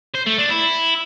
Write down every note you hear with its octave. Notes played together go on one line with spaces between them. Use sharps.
C5
A3
D4
E4